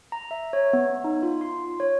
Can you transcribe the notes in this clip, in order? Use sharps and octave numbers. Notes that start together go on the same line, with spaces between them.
A#5
E5
C#5
B3
D#4
F4
C6
C#5